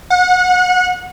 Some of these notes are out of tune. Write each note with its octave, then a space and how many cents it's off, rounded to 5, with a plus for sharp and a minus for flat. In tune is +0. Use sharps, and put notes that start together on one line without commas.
F#5 -30